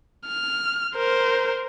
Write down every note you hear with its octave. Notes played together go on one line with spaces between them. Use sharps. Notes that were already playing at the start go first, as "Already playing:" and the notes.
F6
A#4 C5